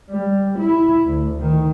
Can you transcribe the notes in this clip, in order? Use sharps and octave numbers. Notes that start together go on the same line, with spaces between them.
G3
E4
D2
D#3